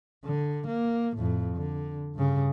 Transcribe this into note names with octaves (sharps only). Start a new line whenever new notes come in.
D3
A#3
F2 A2
D3
G2 C#3